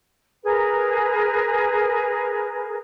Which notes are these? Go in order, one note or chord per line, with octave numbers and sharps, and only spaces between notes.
G#4 A#4 B4